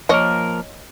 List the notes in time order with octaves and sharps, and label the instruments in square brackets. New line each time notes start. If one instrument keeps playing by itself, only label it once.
[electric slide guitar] F3 A#3 A#4 [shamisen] C#5 D#5